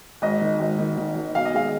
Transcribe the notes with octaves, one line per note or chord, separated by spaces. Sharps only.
G#1 D#5
D#3
G#1
D#3
D#3
D#3
B1 F5
D#5
G#3 F5